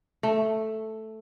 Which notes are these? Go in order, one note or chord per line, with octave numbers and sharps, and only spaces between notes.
A3